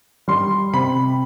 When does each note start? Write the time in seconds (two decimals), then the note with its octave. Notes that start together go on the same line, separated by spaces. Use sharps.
0.28 G3 C6
0.73 C3 B5